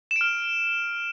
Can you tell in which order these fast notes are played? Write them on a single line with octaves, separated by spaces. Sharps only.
E7 D7 F6